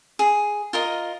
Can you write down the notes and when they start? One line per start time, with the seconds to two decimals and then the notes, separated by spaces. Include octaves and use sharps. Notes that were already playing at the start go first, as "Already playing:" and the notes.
0.19 G#4
0.73 F4 A#4 D#5